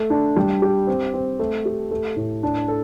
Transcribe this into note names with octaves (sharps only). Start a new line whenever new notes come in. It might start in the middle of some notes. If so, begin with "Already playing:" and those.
Already playing: A3
D4
G3
G4
C4
C4
A3
G4
A3
A2
D4
A4